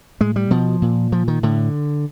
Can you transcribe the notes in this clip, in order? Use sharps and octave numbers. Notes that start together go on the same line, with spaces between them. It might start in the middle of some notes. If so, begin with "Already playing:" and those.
A2 G#3
G3
B2 F3
A#2
A#2 F3
D#3
A2 D3